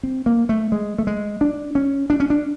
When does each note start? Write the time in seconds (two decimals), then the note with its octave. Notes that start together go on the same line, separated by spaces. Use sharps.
0.03 C4
0.26 A#3
0.49 A3
0.72 G#3
0.98 A3
1.07 G#3
1.41 D4
1.75 C#4
2.10 D4
2.20 C#4
2.30 D4